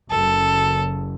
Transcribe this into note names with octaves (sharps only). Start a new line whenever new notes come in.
F#1 A4